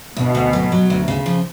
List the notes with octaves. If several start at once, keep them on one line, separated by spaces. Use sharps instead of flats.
D2 B2
D2
F#3
F#3
D2
C#3
F3